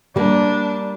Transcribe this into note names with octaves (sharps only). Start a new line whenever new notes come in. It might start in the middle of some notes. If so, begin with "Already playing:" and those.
G3 A#3 D4